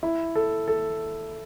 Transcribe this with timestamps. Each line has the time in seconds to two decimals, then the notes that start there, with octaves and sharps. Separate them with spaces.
0.03 E4
0.36 A4
0.68 A4